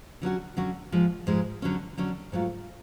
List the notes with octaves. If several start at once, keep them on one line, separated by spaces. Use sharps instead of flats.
D3 F#3 C#4 F#4
D3 F#3 C#4 F#4
G#2 F3 G#3
G#2 F3 G#3
D3 F#3 C#4
D3 F#3 C#4
G#2 F#3 A3 F4